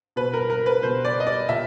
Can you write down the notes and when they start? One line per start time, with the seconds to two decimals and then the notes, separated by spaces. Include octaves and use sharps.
0.16 B2 B4
0.34 A#4
0.50 A#4
0.66 B4
0.83 B2 C5
1.05 D5
1.20 D#5
1.27 D5
1.49 A#2 E5